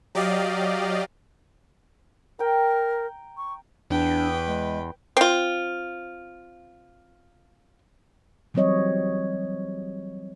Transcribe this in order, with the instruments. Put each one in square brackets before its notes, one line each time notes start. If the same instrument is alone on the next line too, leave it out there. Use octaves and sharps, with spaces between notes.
[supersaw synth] F#3 G4 D5 D#5 F5
[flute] A#4 [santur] G5 A#5
[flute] C#6
[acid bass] E2 [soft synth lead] D4 [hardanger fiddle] B4 G5
[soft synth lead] G#3
[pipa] C4 F4
[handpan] E3 F#3 G3 C4 C#5 D#5